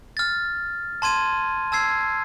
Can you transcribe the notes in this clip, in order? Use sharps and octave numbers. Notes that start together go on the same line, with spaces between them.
F6 A6
A5 C6 G#6 D#7
A5 E6 G#6 C7